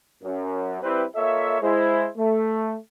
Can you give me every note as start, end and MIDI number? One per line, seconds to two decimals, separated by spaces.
0.23 0.79 42
0.82 1.04 55
0.82 1.04 60
0.82 1.04 64
0.82 1.04 71
1.15 1.58 58
1.15 1.58 65
1.15 1.58 69
1.15 1.58 73
1.15 1.58 75
1.15 1.58 76
1.62 2.07 56
1.62 2.07 64
1.62 2.07 72
2.17 2.76 57